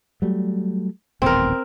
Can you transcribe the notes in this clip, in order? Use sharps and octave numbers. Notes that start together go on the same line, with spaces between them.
F#3 G3 A3
D#1 A1 B3 C4 A#4